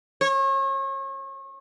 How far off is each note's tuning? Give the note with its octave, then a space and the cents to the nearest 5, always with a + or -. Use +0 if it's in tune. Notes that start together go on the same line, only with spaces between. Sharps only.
C#5 -35